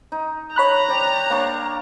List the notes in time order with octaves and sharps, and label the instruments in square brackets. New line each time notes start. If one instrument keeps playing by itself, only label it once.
[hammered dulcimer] D#4
[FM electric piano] C#5 B5 F#6 [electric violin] A#5
[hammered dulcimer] C5 D5 G5
A#3 D4 C#6